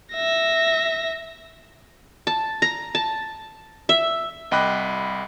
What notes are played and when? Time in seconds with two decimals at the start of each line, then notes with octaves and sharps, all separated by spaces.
0.13 E5 A#6
2.27 A5
2.62 A#5
2.95 A5
3.89 E5
4.51 C2 D#5 G5 B5 D6 F#6